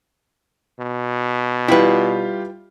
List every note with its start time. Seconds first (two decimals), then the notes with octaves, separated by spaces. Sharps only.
0.79 B2
1.68 G3 E4 F4 G4 B4